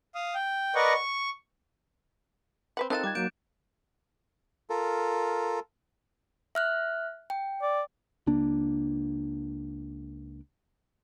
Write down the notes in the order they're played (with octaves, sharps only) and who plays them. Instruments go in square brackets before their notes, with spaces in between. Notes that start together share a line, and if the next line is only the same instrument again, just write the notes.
[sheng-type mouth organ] F5 D#6
G5
A#4 B4 D5 D#5 F#5 C#6
C#6
[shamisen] C4 B4 F#5
[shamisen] D#3 D#4 F4 [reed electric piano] C4 A4 [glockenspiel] F#6 A6 E7
[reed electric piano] G3 G5 G#6 [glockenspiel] D6
[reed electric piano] F#3 A#3 [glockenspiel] G6 D7 E7
[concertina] F4 A4 A#4
[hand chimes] E5 F6 F#6
G5
[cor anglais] D5
[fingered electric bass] C#2 A#3 D4